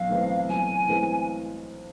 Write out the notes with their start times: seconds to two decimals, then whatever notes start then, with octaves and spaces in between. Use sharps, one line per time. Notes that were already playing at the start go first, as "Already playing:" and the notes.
Already playing: B1 F5
0.09 A2 E3 G#3 C4
0.49 B1 G#5
0.88 A2 E3 G#3 C4